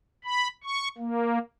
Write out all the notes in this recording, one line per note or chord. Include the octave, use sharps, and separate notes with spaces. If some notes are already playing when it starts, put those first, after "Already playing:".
B5
C#6
A#3